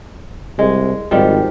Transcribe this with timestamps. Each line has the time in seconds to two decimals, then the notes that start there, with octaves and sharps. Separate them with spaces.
0.59 C2 G#3
1.11 G#1 D#3 F3 G3